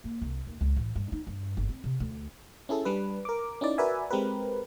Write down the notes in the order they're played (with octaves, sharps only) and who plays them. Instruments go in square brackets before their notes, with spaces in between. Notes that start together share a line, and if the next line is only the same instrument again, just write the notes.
[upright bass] A#3
C2
D#2
C#2
A1
G2
D#4
G2
G1
C4
C3
D2
[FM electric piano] C#4 E4 G#4 A4
G3 D4 B4
A#4 D6
C#4 D#4 E4 D5
F#4 A#4 B4 D5 E5 G#5
G#3 C4 G4 A#4 B4